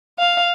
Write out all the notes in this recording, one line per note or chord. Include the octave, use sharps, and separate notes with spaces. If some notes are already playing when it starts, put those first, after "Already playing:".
F5